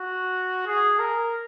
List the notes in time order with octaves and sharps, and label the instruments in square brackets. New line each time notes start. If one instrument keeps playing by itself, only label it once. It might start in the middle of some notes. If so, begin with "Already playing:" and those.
Already playing: [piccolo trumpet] F#4
G#4
A#4